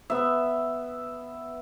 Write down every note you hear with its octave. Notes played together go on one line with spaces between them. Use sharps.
B3 E5